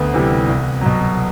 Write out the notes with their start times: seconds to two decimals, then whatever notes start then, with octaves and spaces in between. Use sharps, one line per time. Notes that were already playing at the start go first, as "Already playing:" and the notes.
Already playing: D2 B3
0.13 C3 E3 G3
0.48 C2
0.81 B2 F#3